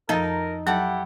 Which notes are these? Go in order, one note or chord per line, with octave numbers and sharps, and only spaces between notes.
F2 F3 D#4 A4 A#4
F#3 E4 G4 A4 F#5